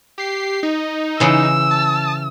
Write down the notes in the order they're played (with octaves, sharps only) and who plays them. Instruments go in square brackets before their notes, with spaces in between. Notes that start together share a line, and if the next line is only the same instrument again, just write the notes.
[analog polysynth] G4 C7
D#4
[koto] C#3 E3 [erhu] E6
[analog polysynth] A5